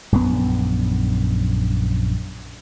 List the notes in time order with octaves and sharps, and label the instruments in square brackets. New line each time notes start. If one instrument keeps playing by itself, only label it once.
[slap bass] A#1 F#2 D3 B3